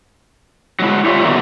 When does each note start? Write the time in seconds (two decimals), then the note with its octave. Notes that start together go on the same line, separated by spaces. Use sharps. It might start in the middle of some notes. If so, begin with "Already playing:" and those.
0.80 F#3 G#3 E4
1.06 F4 G4 C#5 D5 E5
1.24 F#2 B2 D#3 A3 A#3